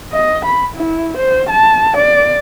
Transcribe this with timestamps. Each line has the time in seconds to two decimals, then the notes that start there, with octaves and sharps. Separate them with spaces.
0.13 D#5
0.46 B5
0.76 E4
1.18 C5
1.50 A5
1.98 D5